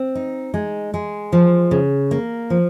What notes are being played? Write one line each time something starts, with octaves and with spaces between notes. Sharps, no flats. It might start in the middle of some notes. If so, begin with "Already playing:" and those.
Already playing: C4
D#4
G#3
G#3
F3
C#3
A#3
F3